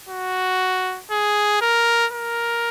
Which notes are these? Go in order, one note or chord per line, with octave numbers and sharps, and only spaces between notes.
F#4
G#4
A#4
A#4